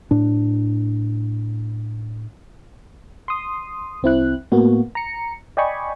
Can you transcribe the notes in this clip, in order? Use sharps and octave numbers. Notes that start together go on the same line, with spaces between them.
A2 D4
C6 D#6
C2 C4 E4 F#6
A2 A#3 B3 F#4
A#5 C#7
D5 D#5 G5 G#5 B5 C#6